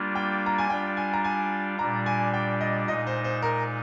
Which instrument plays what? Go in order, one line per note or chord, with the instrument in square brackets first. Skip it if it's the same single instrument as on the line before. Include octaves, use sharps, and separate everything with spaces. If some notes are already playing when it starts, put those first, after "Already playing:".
Already playing: [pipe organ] G3 A#3 D4 F4
[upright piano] G5
A#5
G#5
[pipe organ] G3 D4 F4 [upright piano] G5
[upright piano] G#5
A#5
G#5
[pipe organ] A#2 G3 D4 [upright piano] A#5
[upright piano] G#5
G5
D#5
[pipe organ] A#2 G#3 D#4 [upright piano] D#5
[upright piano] C5
C5
A#4